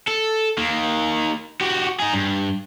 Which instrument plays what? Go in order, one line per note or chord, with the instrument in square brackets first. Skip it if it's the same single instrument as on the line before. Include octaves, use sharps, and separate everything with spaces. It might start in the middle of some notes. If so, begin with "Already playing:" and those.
[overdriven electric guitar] A4
D#3 A#3
F#4 G4
D#4 G#4
G2